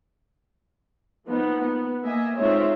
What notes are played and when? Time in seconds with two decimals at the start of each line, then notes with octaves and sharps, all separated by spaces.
1.27 F3 A#3 B3 D#4
1.60 B3
2.02 A#3 D#5 E5 G#5
2.38 G#3 C4 D#4 F4 C#5 E5